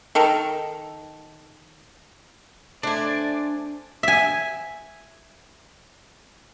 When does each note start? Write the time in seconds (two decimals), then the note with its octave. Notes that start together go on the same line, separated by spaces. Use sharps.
0.15 D#3 A4 A#4
2.83 A3 D4 C5 D5 G#5
4.03 E5 G#5